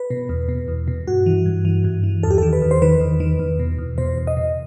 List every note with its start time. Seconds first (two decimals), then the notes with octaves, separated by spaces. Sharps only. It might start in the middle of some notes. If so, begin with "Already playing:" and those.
Already playing: B4
0.10 B2
0.29 E2
0.49 B2
0.68 E2
0.88 B2
1.07 G2 F#4
1.26 E3
1.46 G2
1.65 E3
1.84 G2
2.04 E3
2.23 E2 A4
2.31 G4
2.38 D#3 A4
2.53 B4
2.62 E2
2.71 C5
2.82 D#3 B4
3.01 E2
3.20 D#3
3.39 E2
3.59 B2
3.79 E2
3.98 B2 C5
4.17 E2
4.27 D#5
4.37 B2